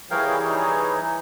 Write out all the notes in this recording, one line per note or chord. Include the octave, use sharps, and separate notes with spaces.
E3 G3 G#4 A#4 C#5 F5 G5
D#4